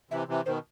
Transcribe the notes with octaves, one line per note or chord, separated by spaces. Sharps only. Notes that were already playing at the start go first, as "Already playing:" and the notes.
C3 E3 E5
C3 E3
B2 D#3 C5